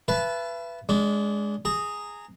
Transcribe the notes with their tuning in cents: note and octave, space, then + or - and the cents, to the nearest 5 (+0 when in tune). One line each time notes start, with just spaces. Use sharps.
B4 +0 E5 +40 A5 -25
G#3 +0 D4 -25
G#4 +0 A#5 -20